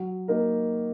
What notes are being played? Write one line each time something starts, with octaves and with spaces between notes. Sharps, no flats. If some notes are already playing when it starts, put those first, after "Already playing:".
Already playing: F#3
A#3 D#4 A#4